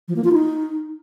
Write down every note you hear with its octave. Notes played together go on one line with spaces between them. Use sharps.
F3
A#3
F4
D#4